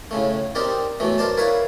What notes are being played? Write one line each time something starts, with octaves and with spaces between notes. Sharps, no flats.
A2 C#3 A3
C4 D#4 G4 A#4 D5
B2 E3 F#3 A3
A#4 C5 D5 A5
E4 A#4 B4 C#5 E5 F5